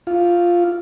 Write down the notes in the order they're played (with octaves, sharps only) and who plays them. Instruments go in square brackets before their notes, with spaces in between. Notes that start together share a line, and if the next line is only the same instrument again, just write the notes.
[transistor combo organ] F4